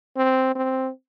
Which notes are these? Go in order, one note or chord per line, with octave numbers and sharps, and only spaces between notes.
C4
C4